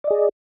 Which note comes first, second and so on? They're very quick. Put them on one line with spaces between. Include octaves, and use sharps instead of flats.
D5 D#5 G#4